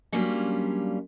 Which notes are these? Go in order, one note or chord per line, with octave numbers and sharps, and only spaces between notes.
F#3 G3 A#3 C#4 D4 F4